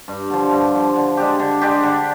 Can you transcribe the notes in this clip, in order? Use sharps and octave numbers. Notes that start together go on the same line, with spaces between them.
G2
D3 F3
G2
D3 F3
D3
G#3 D4 G4
D3
G#3 D4 G4
D3